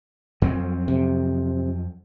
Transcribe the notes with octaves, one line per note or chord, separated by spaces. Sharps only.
F2 F#3 C4
C3